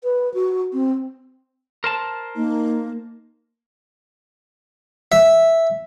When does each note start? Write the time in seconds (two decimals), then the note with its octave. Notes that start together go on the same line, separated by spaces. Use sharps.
0.03 B4
0.34 F#4
0.73 C4
1.84 A#4 C5 A5
2.36 A#3 D#4
5.12 E5